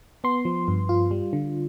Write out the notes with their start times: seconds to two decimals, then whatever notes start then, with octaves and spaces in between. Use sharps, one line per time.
0.24 B3 C6
0.45 F3
0.68 G2
0.89 F4
1.11 G3
1.33 D3